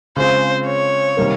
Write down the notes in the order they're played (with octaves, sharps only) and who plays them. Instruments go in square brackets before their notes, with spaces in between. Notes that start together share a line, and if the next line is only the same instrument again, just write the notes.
[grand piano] C#3 G#3 C4 F4 [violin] C5
[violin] C#5
[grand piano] C3 D#3 G3 A#3